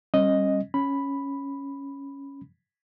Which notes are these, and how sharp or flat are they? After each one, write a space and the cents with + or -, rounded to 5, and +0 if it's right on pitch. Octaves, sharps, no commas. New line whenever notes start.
G3 +0 C#4 -35 D#5 +0
C#4 +0 B5 +0